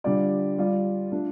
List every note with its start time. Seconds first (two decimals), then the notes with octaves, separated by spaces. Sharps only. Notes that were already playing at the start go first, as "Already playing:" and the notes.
0.04 D3 G3 F4 D5
0.58 G3 F4 D5
1.12 A3 D4 F4